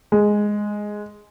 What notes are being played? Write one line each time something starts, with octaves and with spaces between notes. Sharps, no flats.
G#3